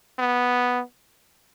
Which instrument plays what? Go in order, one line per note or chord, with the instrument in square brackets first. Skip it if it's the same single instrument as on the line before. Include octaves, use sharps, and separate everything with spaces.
[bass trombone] B3